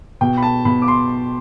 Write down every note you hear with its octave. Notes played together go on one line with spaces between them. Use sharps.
B2 G5
B5
A5
B2 B5
D6
C6